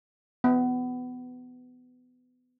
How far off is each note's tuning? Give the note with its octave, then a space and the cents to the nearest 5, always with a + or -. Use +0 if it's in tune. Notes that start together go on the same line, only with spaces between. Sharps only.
B3 +25